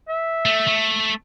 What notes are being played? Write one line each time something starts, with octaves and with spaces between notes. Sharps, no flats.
E5
A3
A3